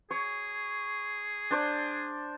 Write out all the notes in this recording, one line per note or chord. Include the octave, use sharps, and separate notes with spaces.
G#4 C#5
D4 C5 D5